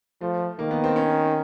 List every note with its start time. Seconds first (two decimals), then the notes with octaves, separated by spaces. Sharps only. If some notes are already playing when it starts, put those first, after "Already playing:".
0.21 F3 A3
0.59 D#3 A#3
0.71 B3
0.84 C4
0.96 C#4